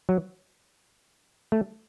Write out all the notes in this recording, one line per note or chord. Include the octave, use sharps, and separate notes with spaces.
F#3
A3